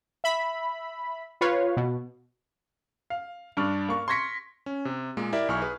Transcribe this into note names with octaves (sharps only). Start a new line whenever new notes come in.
E5 B5
F4 B4 C#5 F5
B2
F5
G2 D4 C#6 F6
A#3 C#6
C6 C#6 G#6 A#6 B6 C#7
C#4
C3
A#2 G#3 A#3
E4 G4 A#4 D5 E5
B1 E4 G#5 C#6 F6
G#4 B4